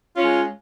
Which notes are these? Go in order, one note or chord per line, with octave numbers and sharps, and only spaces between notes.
G#3 C#4 F4